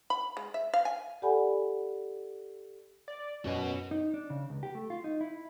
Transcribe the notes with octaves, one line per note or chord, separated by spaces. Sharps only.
B5
G#3
E5
F5
G#5
G4 A4 D5 F#5 G#5 B5
D5
F#2 B2 C#4 F#4 D#5
D#4
D4
C#3
C#2
G4
A3
F4
D#4
E4